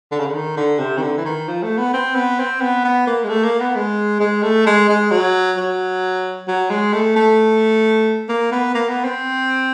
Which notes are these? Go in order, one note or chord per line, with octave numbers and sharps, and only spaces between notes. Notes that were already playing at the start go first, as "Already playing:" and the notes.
D3
C#3
D3
D#3
D3
C3
D#3
D3
E3
D#3
F3
A3
B3
C4
B3
C4
B3
B3
A#3
G#3
A3
A#3
B3
G#3
G#3
A3
G#3
G#3
F#3
F#3
F#3
G#3
A3
A3
A#3
B3
A#3
B3
C4